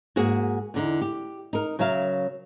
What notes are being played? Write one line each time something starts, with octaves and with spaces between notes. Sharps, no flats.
G#2 A#3 F#4 G#4
E2 D3 D#4
G4
D#4 A#4
C#3 F#3 A#4 E5 F5